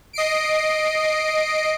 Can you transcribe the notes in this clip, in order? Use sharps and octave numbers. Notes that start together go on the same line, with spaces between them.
D#5 C7 D7